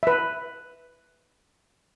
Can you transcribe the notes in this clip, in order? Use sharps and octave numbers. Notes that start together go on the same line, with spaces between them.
B4 E5